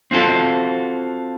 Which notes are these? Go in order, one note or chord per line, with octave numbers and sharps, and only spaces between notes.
C4 F4 F#4 A4